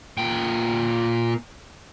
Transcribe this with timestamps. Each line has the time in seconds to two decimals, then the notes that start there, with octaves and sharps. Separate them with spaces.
0.18 A#2 G5